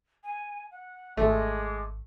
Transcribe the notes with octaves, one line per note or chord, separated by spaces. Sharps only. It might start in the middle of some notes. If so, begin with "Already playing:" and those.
G#5
F#5
G#1 G#3 A3 D6